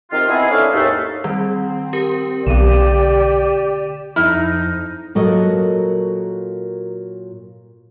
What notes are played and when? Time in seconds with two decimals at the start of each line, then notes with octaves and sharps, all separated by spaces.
0.11 C3 D#3 F4
0.28 B3 C4 D#4 E4 G#4
0.50 C#4 D4 E4 A4 D#5 F5
0.73 D#2 G#2 A3
1.24 D#3 G3 C4
1.93 G4 A#4
2.47 B1 D3 G4 D5 D#7 E7
4.16 F2 D#4 E4 F6
5.15 A#2 F#3 F#4 A4 A#4 D#5